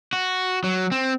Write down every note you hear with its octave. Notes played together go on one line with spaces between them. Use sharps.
F#4
F#3
C4